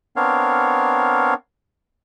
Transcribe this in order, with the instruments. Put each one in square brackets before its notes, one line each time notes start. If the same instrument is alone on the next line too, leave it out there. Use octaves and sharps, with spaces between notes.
[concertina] B3 C4 D4 A#4 C#5 F5